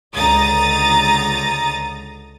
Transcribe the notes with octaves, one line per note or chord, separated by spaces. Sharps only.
C#2 D3 A#5 D#6 A6